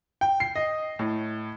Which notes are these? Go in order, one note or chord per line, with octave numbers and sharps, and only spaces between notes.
G5
C7
D#5
A2